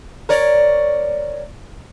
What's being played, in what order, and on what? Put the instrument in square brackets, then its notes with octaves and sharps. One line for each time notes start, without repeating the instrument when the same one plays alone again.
[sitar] A#4 C#5 D5